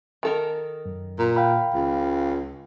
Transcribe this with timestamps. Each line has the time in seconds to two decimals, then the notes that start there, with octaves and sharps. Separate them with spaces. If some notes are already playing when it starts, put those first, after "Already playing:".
0.23 D#3 A4 A#4
0.85 F#2
1.18 A#2
1.36 F5 G5 B5
1.74 C#2